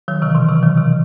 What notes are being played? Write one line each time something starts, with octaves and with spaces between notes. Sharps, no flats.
D#3 F#3
C3 E3
B2 D#3
C3 E3
D#3 F#3
C3 E3